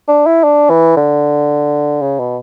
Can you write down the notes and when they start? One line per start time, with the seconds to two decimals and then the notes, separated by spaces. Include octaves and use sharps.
0.08 D4
0.26 E4
0.44 D4
0.70 E3
0.97 D3
2.02 C#3
2.19 B2